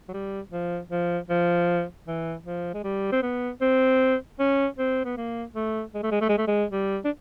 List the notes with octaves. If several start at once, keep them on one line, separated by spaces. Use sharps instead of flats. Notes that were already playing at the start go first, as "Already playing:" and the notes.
F#3
G3
F3
F3
F3
E3
F3
G#3
G3
C4
B3
C4
C#4
C4
B3
A#3
A3
G#3
A3
G#3
A3
G#3
A3
G#3
G3
D4